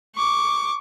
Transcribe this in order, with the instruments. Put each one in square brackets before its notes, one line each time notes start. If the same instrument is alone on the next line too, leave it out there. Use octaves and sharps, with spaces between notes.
[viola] C#6 D6